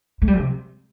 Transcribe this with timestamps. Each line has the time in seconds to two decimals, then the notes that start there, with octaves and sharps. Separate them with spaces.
0.22 A3
0.28 G3
0.38 C3